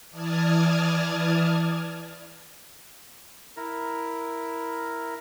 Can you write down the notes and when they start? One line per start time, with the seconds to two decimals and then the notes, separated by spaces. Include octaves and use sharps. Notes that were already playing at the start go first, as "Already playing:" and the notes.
0.10 E3 D5 A5 D#6 F6 G#6
3.57 E4 A#4 A#5